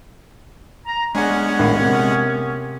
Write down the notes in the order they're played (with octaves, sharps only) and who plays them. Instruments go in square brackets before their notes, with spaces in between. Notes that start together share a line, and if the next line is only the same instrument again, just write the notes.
[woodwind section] A#5
[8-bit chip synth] G#3 F#5 [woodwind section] B3 C#4 [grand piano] D4 G#5
[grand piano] A#1 A2 D#3
C3 A#3